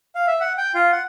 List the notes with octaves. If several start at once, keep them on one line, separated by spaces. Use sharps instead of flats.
F5
E5
F#5
G5
F4
F#5